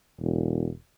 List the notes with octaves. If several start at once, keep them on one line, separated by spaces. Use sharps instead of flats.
E1